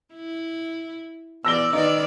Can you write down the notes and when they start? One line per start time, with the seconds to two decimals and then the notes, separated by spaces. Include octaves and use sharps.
0.14 E4
1.45 E2 D5 E6 A#6 G7
1.73 D#3 D#4 B4 D5